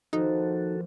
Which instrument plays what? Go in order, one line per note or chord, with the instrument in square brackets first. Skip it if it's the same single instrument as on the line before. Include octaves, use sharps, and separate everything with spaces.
[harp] D#2 F3 [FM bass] D#4 [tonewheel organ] F#4 A4